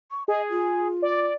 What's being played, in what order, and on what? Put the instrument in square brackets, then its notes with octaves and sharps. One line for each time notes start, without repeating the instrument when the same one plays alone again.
[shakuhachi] C#6
[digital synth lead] G#4 [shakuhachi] D#5
[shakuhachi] F4
[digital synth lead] D5